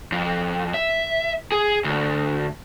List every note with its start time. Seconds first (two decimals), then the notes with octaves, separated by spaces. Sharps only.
0.12 F2
0.74 E5
1.52 G#4
1.84 D2